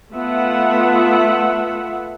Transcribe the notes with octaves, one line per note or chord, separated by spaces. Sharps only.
A3 B3 F4 E5 F#5